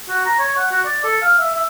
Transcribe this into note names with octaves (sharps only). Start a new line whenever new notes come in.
F#4
A#5
C#5
F#5
F#4
D5
A4
F5
E5
E5